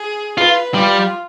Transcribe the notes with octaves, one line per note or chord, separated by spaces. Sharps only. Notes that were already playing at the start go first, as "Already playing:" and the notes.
Already playing: G#4
F4 B4
G3 F4